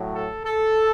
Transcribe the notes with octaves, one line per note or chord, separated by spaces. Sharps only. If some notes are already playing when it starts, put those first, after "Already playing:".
Already playing: A2 F#3
A4
A4